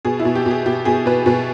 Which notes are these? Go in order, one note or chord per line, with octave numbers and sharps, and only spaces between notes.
B2 G#4
E4
B2
G4
B2 G#4
B2 G4
B2 G#4
B2 B4
B2 B4